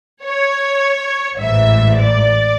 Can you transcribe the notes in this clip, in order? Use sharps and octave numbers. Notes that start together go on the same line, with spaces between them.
C#5
A1 G#2 E3 E5
D5